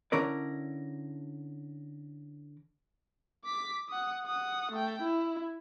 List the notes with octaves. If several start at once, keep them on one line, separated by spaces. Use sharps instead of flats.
D3 C#4 E4 A#4 D5
D6 B6
F#5 D#6
F#5 D#6
A3 G5
E4